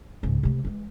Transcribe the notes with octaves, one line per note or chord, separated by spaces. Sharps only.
C#2 G#2
C3 A3
E3 G#3